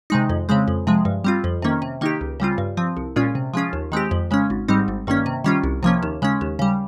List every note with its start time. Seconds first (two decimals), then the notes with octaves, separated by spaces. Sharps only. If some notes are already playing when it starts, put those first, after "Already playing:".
0.10 C3 D#3 G#3 D#4
0.30 F2
0.49 C#3 G#3 C4
0.68 F2
0.87 C3 F3 G#3
1.05 G2
1.24 G3 C4 F4
1.44 F2
1.62 C3 D#3 A#3 C#4
1.82 C3
2.01 D#3 A#3 D#4 G4
2.21 C#2
2.40 C#3 G3 C4 F4
2.58 G2
2.77 F3 C4
2.97 C2
3.16 A#2 G#3 C#4 F4
3.35 C3
3.54 F3 G#3 C#4 F4
3.73 D#2
3.92 D#3 G#3 C4 G4
4.11 F2
4.31 C#3 G#3 C#4
4.50 G#1
4.68 G#2 G3 C4 D#4
4.88 G#1
5.07 G2 D#3 A#3 C#4
5.26 C3
5.44 D#3 G3 C#4 F4
5.64 C2
5.83 C3 F3 A#3 C#4
6.03 D#2
6.22 C#3 G#3 C#4
6.41 D#2
6.59 C#3 G3